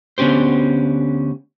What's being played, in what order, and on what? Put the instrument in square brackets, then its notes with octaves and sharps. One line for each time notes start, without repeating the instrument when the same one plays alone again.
[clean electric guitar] D2 D3 B3 C#4 G4 C5